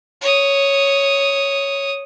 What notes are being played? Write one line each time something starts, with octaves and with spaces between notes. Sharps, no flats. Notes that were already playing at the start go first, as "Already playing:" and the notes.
C#5 D#6